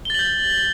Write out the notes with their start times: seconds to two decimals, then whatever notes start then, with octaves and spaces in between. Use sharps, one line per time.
0.05 G7
0.10 A6
0.14 F#7
0.19 G6